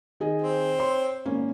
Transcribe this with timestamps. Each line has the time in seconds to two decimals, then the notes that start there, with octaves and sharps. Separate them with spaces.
0.20 D#3 G#4 D#5
0.42 C4
0.78 C#5 C6
1.25 G#1 A#3 C#4